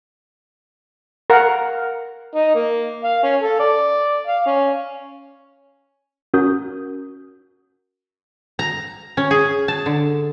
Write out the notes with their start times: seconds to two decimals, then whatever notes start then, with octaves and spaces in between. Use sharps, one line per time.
1.30 A#4 F5 F#5
2.35 D#4
2.55 A#3
3.04 F5
3.23 C#4
3.41 A4
3.60 D5
4.27 F5
4.46 C#4
6.34 C#4 F#4 A#4 D#6 G6
8.59 A#5
9.17 C#4
9.31 G#4
9.68 A5
9.86 D3